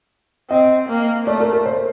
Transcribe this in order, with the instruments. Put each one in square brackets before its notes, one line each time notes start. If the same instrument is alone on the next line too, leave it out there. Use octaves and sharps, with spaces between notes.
[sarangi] C4 [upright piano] D#5
[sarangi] A#3
[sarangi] A3 [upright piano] D5
[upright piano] A#4
A#4
C5